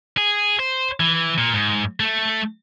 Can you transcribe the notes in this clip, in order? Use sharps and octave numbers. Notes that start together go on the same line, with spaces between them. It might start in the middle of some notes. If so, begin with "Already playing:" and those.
G#4
C5
E3
A#2
G#2
A3